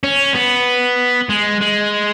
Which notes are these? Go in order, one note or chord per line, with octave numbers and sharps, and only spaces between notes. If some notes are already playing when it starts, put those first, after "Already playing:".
C#4
B3
G#3
G#3